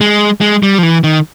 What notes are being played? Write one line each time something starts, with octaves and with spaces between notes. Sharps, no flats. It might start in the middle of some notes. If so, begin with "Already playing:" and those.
G#3
G#3
G3
F3
E3
D#3